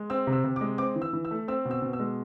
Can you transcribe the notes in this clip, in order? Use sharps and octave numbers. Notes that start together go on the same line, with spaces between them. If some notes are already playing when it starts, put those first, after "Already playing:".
Already playing: G#3
C4 E6
C3
E6
C3
D6
G#3
C4 D6
E3
E6
E3
E6
A3
C4 E6
B2
E6
B2
E6
G#3